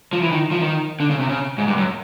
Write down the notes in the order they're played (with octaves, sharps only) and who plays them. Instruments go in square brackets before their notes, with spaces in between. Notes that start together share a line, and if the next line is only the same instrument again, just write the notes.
[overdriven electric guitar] F3
E3
D#3
F3
D#3
D3
C#3
C3
C#3
G#2
G2
F#2